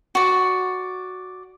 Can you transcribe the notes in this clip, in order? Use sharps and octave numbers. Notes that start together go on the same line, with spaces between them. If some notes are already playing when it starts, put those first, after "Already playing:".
F#4 D5